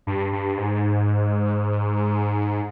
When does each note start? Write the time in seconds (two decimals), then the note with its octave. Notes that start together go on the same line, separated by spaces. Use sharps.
0.07 G2
0.33 G2
0.57 G#2